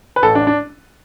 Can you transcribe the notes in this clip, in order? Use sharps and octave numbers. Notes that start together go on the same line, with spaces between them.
B4
A1 A4
D4
D4